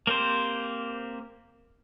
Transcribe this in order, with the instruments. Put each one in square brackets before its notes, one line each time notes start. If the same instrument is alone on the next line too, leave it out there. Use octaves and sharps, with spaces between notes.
[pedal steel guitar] A#3 C4 G4 C5